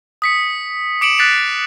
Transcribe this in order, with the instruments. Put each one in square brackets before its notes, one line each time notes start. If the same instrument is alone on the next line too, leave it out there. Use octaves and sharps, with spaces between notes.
[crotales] D#6 B6 C#7
D6 C#7 D7 E7 F#7
F#6 A6 B6 C7 D7 F7